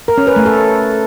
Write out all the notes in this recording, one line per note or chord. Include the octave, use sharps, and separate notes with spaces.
A#4
C#4
B4
A3
A4